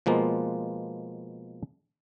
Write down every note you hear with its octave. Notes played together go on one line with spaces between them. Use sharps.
B2 F3 G#3 A#3 B3